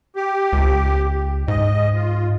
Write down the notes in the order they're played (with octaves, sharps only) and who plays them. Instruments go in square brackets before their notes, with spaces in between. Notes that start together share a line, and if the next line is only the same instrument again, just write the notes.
[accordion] G4
[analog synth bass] C#2
[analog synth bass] G#2 [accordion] D#5
[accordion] F4